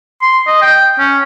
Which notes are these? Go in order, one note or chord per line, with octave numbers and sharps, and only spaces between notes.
C6
D#5
G5
C#4